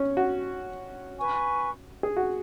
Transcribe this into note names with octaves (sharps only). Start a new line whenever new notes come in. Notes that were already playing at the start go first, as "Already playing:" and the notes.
Already playing: C#4
F#4
B4 G#5 C#6
G#4
F#4